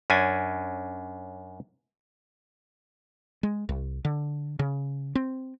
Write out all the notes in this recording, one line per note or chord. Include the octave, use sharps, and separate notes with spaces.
F#2 C#4 D4 G#5
G#3
C2
D3
C#3
C4